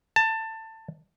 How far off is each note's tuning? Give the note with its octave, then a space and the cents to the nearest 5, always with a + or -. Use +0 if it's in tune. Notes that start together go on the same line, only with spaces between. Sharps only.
A5 +20